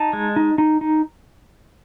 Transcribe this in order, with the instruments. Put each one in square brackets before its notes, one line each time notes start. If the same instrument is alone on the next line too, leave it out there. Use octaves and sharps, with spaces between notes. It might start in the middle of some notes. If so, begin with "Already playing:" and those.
Already playing: [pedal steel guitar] D#4 A5
G#3
D#4
D#4
D#4